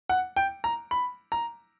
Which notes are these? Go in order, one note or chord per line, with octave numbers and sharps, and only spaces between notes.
F#5
G5
A#5
B5
A#5